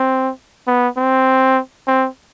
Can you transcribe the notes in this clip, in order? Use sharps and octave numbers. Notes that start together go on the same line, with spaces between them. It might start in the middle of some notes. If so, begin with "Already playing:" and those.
Already playing: C4
B3
C4
C4